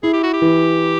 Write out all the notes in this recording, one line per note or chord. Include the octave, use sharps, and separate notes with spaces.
E4 G#4
G4
F#4
G4
E3